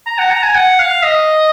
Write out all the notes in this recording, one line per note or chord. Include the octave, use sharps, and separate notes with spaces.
A#5
F#5
A#5
G#5
F#5
F5
D#5